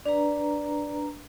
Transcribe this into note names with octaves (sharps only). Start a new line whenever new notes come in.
D4 B4 D5 A#5